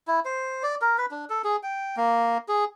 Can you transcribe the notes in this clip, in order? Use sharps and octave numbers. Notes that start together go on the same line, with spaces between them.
E4
C5
D5
A#4
B4
D4
A4
G#4
G5
A#3
G#4